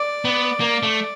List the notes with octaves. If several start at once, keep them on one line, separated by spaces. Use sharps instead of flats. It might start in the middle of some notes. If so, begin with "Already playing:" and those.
Already playing: D5
B3
A#3
A3